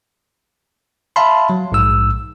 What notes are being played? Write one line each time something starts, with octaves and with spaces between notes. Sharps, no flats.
E5 F5 A5 B5 C6
F#3
A#1 G#2 E6